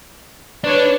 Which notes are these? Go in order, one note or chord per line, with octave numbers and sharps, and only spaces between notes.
D4 B4 C#5